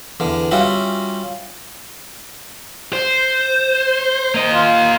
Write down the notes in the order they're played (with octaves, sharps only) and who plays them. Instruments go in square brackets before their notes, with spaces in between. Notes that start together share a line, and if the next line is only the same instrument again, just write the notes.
[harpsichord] E2 D3
G3 C#4 F4 F#4 E5 F#5
[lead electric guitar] C5
A#3 D#5
[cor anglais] F4